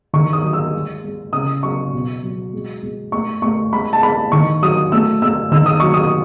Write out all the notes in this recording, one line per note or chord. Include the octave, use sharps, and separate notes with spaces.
D#3 C#6
D#6
F#3
E6
G#3
G#3
C#3 D#6
F#3 C#6
B2
F#3
G#3
G#3
A3 C#6
A3 C#6
G#3 B5
A5
G#3 B5
D#3 C#6
F#3 D#6
A3 E6
A3 E6
D#3 E6
D#6
F#3 C#6
D#6